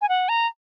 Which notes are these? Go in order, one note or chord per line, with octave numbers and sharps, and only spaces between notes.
G#5
F#5
A#5